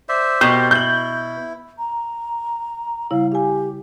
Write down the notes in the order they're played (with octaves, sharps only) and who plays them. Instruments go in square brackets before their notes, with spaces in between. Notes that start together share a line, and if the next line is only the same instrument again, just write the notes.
[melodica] C5 D5 E5
[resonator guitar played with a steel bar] B2 [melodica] C4 G4 A#4 [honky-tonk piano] G6
[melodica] E4 [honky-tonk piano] G6 F#7
[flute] A#5
[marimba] C#3 G3 E4 [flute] F5
[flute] G4 [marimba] F5 G#5